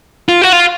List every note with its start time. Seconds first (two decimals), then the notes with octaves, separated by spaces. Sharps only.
0.29 F4
0.42 F#4
0.53 F4